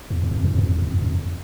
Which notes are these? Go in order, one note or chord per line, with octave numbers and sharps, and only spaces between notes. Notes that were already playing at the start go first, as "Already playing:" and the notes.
E2
E2
F2
G2
E2
F2
E2
F2
F2